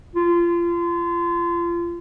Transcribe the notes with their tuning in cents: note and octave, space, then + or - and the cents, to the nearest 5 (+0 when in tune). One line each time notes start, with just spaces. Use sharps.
F4 -30